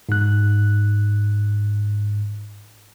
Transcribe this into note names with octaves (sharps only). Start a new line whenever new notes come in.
G#2 F#6